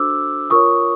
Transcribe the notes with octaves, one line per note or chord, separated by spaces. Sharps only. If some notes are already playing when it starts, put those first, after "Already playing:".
Already playing: D4 F#4 A4 C5 D6 E6
F4 A#4 C#5 C#6 D#6